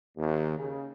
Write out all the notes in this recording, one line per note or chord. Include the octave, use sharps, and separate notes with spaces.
D#2
C#3